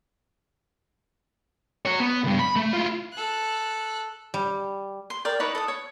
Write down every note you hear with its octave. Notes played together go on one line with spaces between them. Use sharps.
F#4 C#5
B3
C#2 G2
B5
A3
E4 F4
A4 F#6
G3
C6
A#4 D5 G5
D#4 E4 B4 C#5
A4 D#6
C#5